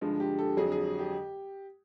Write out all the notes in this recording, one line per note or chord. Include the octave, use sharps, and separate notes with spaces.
G2 D3 F3 G#3
G4
A4
F2 D3 F#3 G#4
G#4
G4